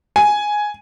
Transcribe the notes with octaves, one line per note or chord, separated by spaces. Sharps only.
G#5